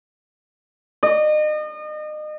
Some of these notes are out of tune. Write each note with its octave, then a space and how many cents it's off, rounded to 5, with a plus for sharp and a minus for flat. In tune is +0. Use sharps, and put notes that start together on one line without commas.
D#5 -35